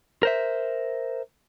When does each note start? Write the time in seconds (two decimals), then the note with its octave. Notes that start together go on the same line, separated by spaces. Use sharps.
0.23 A#4 C5 E5